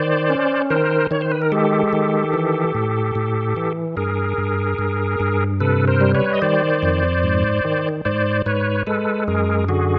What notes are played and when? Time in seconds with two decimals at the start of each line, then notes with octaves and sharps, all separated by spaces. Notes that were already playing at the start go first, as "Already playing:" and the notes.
Already playing: D#3 C5 D5
0.30 C#4
0.70 D#3 A#4 C5
1.11 D#3 C#5
1.21 C5
1.32 B4
1.42 A#4
1.52 G#3 G4 A4
1.93 D#3
2.33 E3
2.75 A2
3.15 A2
3.57 E3
3.97 G2 G#4 A#4
4.38 G2
4.79 G2
5.20 G2
5.60 C3 A4 B4
5.87 A#4 C5
6.01 G3
6.15 B4 C#5
6.33 D#5
6.42 D#3 C5 D5
6.83 F2
7.24 G#2
7.65 D#3
8.05 G#2 C5 D5
8.46 G#2 B4 C#5
8.87 G#3 A4 B4
9.28 F#2 G#4 A#4
9.69 D3 F#4 G#4